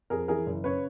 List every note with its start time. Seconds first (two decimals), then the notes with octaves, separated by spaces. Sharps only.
0.10 F2 G#4 A#4
0.28 E3 G#4 A#4
0.46 F#1
0.64 C#3 B4 C#5